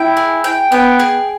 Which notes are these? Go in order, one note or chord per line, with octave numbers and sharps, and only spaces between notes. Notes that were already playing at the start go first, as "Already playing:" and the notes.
Already playing: E4 G5
G#4
G5
B3 G5
G#4